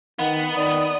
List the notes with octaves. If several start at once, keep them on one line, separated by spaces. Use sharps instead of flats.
D#3 B3 F#5
D#3 D5 D#6